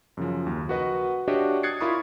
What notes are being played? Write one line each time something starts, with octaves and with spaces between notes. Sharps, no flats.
F#2 C#3 F3
D#2
F#4 A#4 B4 D#5 F#5
D4 F#4 G4 C#5 D#5 E5
D#6 F#6 G#6 A6 C7 C#7
E4 F4 A#4 B5 C#6 D#6